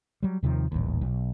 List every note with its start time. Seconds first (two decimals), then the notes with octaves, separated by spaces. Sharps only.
0.23 F#3 G3
0.43 D#2 C3 D#3 F3
0.72 D#1 A1 D#2
1.01 B1